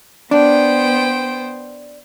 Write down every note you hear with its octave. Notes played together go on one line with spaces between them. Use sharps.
B3 D4 C5 G5